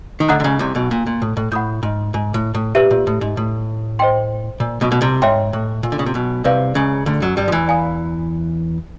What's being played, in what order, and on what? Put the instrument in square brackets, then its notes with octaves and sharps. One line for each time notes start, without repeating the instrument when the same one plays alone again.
[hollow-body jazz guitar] D#3
[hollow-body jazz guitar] D2 D3 [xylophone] D#5 F#5 A#5 D#6 F#6
[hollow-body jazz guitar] D3
C#2 C#3
C2 C3
B1 B2
A#2
A#2
A2
A2
[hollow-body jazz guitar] A2 [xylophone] F#5 B5 D#6 G6
[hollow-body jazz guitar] G#2
G#2
A2
A2
[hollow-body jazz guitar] A#2 [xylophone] G4 B4 E5
[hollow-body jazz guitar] A#2
A2
G#2
A2
[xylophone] C5 D#5 G5 C6
[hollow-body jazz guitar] A#2
B1 B2
B2
C2 C3
[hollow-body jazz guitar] G#2 [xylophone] C#5 E5 G5 C6
[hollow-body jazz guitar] A2
A#2
D3
C#3
C3
B1 B2
[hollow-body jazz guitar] C2 C3 [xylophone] B4 D5 F5
[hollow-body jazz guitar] C#2 C#3
D2 D3
F#2 F#3
G2 G3
F3
E2 E3
[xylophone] D5 F5 G#5 B5 D#6